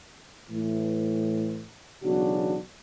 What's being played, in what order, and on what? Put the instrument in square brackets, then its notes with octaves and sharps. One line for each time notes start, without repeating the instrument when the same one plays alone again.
[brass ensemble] A2 E3
B1 E2 C#3 D4 F#4